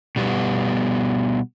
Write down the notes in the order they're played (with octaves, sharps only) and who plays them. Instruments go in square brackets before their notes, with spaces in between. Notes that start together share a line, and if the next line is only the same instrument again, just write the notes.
[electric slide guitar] B2 G3 B3